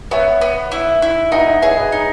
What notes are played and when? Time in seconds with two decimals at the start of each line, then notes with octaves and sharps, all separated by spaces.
0.11 B3 C#5 E5
0.41 B3
0.72 E4
1.02 E4
1.32 D#4 D#5 F#5
1.47 D#5 F#5
1.62 G#4 C#5 E5
1.77 B4 D#5
1.92 D#4